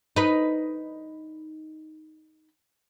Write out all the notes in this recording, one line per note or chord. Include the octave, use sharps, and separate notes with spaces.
D#4 B4